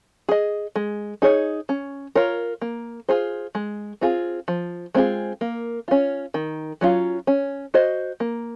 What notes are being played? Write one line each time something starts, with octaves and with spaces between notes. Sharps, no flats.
G#4 D#5
G#3
D#4 G#4 C#5
C#4
F4 A#4 C#5
A#3
F4 G#4 C5
G#3
C4 F4 G#4
F3
G#3 C4 F4 G#4
A#3
C#4 F4
D#3
F#3 C#4 F4
C#4
F#4 C5 D#5
A#3